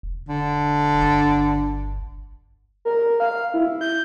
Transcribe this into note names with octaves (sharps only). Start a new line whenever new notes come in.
E1
D3
G1
A#4
F5
E4
G6